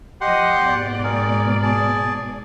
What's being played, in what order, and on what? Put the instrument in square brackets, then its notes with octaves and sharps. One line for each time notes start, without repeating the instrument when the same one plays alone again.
[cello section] F3 D#5 [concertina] G4 F#5 C6
[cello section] G#2 B2 D5
[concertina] G#4 A#4
G#4 A5